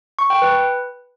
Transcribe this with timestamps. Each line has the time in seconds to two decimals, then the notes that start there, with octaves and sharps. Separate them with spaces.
0.19 C#6
0.30 G5
0.42 B4